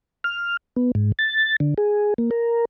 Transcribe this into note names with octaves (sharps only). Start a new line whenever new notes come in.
F6
B3
G#2
A6
D3
G#4
A#3
A#4